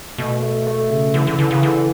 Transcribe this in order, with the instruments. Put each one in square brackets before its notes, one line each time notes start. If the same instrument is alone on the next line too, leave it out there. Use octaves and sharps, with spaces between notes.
[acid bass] B2 [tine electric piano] A3
[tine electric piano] A3
A3
C#3
[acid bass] D3 [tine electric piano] E3
[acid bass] D3
[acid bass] D3 [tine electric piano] E3
[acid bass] C#3
[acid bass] D3 [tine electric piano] E3